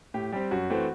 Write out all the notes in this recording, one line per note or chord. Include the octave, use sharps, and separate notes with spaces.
A2 G4
G3 C4 G4
F#2 F#4
E3 A3 C4